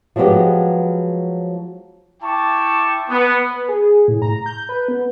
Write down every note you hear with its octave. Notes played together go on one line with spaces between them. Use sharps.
F3 F#3 G#3 B3 G4 D#5
E4 G5 A5 C#6 D6
B3
B4
G#4
A2
A#5
G6
B4
B3